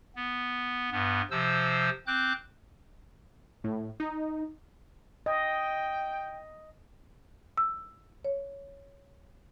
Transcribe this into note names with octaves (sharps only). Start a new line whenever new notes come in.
B3
G2 B3
C3 F3 C5 E6
C4 D6 F#6 G6
A2
D#4
D#5 G5
E6
C#5